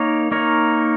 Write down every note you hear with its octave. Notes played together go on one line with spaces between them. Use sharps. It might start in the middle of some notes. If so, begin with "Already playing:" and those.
Already playing: A#3 D#4 A#4 C#5
A#3 D#4 A#4 C#5